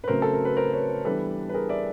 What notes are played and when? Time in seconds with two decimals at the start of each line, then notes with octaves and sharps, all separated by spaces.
0.04 B4
0.08 C#3 F#3 A3 C4 A#4 C5
0.22 A4
0.33 A#4
0.45 B4
0.57 A#4 C5
0.73 B4 C#5
1.05 E3 G3 B3 D4 A4 B4
1.49 B4
1.54 G#4 A#4
1.69 D5 E5